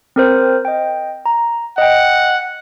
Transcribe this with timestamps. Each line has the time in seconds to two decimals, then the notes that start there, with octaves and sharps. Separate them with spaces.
0.16 C4 A#4 C5
0.65 D#5 G5
1.26 A#5
1.78 D#5 F#5 G5